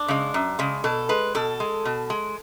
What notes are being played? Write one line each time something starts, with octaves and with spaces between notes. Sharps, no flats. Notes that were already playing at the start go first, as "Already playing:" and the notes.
Already playing: D4
C#3 G#3
F#2
C#3 G#3
B2 A4
G#3 B4
B2 A4
G#3
B2
G#3